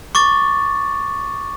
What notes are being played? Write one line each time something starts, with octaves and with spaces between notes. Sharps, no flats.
C#6 D6 A6